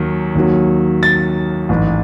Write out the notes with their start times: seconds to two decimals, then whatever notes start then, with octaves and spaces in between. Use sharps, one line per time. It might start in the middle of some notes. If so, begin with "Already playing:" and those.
Already playing: D#2 D#3 F#3
0.35 D#2 D#3 F#3
1.03 A6
1.69 A1 G#2 E3